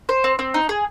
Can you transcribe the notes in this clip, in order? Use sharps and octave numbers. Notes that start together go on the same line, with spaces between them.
C5
C4
C4
D#4
G#4